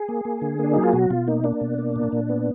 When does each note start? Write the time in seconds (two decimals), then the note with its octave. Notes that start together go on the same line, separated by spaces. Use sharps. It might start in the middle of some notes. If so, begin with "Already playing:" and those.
Already playing: G#4
0.08 A#3
0.25 A#3
0.42 D3
0.59 A#3
0.64 D4
0.74 F#3 D#4
0.83 F4
0.93 B2 F#4
1.10 B2 F4
1.27 A#3 D#4
1.44 A#3 D4
1.61 B2
1.78 A#3
1.96 A#2
2.12 A#2
2.29 B3